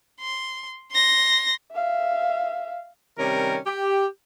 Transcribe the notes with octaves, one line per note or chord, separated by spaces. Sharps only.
C6
C6 A#6
E5 F5
C3 D#3 G3 C#4 G4 A#4
G4